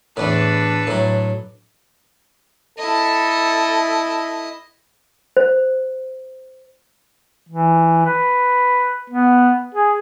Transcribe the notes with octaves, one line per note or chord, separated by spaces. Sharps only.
E2 A2 D4 A4 B4
A2 F#3
E4 A4 D#5
C5
E3
B4
B3
G#4